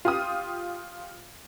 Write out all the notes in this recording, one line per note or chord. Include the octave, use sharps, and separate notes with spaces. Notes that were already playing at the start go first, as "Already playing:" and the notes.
F4 G4 D#6